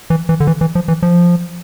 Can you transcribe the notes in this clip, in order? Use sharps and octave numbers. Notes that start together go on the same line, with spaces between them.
E3
E3
D3
E3
E3
F3
E3
F3